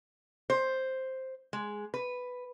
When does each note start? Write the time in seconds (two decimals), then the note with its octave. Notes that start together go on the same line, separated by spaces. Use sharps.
0.50 C5
1.53 G#3
1.94 B4